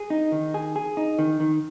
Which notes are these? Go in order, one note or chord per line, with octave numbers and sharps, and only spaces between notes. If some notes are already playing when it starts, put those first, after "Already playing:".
Already playing: G#4
D#4
D#3
G#4
G#4
D#4
D#3
D#3